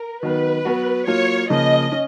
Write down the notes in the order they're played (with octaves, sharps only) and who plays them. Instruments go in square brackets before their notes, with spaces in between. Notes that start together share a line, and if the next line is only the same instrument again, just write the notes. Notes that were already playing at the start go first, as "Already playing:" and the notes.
Already playing: [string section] A#4
[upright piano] D#3 F#3 B3 [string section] B4
[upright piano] F#3 B3 F#4
[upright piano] F#3 A#3 F4 [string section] C#5
[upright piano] C#3 F3 A#3 [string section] D#5
[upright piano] C#4